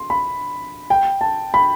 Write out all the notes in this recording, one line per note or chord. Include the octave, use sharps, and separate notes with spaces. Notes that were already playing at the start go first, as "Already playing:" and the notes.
Already playing: C6
B5
G5
A5
B5